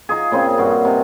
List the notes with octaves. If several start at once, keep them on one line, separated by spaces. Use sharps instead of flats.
D#4 F4 G#4
A#2 C#3 C4 C5
G2 F#4
C3